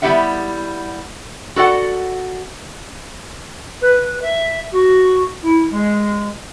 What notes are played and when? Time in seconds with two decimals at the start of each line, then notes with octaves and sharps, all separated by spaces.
0.02 G3 B3 E4 G4 E5 F#5
1.56 F#4 A4 D5 F#5
3.81 B4
4.22 E5
4.72 F#4
5.42 E4
5.70 G#3